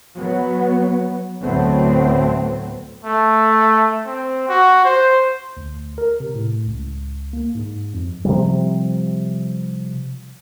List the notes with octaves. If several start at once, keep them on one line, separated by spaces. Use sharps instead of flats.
F#3 B3
D2 A2 F#3 A3 B3 C4
A3
C4
F#4
C5
D2
A#4
C3
A2
C#2
A#3
G#2
F2
C3 F3 G3